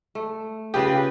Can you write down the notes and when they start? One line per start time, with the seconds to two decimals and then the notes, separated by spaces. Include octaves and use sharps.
0.15 A3
0.74 C#3 C#4 F4 G4 G#4 B4